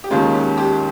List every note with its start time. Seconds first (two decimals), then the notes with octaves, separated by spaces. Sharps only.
0.04 G4
0.10 D#2 D#3 G#3 C#4 F4
0.34 G4
0.58 G4